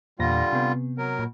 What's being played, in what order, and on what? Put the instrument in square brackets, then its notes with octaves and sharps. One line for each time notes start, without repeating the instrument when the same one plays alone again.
[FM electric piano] E2 A#2 A#6 [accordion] D3 G3 F4
[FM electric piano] C3 B3
[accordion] F#3 A#4
[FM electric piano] A#2